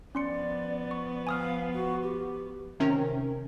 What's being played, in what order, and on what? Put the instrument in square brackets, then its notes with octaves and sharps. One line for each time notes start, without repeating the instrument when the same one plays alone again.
[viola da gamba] F3 B3 [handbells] C#4 C6 C#7 [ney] D5
[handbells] C#6
[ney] F5 [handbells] G#5 D#6 F6
[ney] F#4
G4
[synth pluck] C3 D#3 C#4 A#4